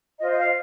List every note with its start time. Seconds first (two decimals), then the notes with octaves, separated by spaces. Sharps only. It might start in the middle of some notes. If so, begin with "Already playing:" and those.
0.20 F4 C5 D#5
0.30 D#5
0.38 F5